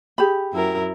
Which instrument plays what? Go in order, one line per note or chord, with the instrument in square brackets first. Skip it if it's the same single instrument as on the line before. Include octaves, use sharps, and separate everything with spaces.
[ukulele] G4 G#4 B5
[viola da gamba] F#2 E4 A#4